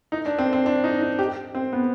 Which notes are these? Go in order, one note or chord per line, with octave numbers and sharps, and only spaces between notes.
D#4
D4
C4
C4
D4
D#4
D#4
G4
C4
B3